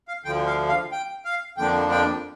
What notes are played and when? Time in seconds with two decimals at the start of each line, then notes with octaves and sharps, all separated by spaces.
0.08 F5
0.24 D2 D3 F3 G5
0.46 F5
0.69 F5
0.92 G5
1.25 F5
1.57 F2 D3 F3 A#3 D4 G5
1.91 G5